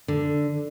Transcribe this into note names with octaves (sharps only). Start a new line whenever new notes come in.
D3